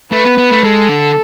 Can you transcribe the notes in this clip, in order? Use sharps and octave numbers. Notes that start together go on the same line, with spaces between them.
A3 B4
B3
B3
A3
G#3 A4
D3